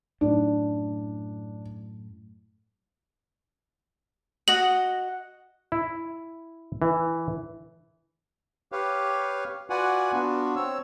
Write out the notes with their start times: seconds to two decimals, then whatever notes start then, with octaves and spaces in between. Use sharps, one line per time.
0.21 F#2 A2 D4
4.48 F#4 D#5 F#5 F#7
5.72 E4
6.82 E3
8.72 G4 B4 C#5 F5
9.70 F4 F#4 B4 D5 F#5 G#5
10.13 B3 D4 F4 F#4
10.56 C4 C#5 E6